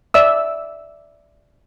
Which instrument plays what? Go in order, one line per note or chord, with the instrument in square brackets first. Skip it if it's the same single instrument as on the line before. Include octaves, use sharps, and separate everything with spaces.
[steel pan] D5 E5 E6